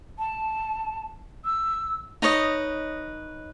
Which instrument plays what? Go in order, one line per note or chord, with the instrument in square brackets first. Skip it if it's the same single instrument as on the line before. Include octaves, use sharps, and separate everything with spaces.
[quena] A5
E6
[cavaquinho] D#4 B4 C#5 D#5